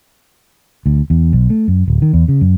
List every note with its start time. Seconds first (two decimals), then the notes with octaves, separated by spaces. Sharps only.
0.86 D2
1.10 E2
1.33 B1
1.50 A3
1.68 F#2
1.88 D1
2.02 D#3
2.13 E2
2.28 C#3
2.41 F#2